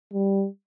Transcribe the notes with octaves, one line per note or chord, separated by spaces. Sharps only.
G3